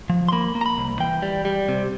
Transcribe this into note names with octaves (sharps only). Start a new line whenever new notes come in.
F3
C6
A#3 B5
A#3
A#5
B5
C2
E3 G5
G3
G3
C3